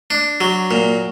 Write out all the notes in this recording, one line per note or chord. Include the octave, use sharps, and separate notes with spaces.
D4
F#3
A#2